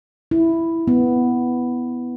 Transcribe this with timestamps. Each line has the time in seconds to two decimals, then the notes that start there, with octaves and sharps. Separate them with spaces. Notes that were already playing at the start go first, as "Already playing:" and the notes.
0.31 E4
0.87 B3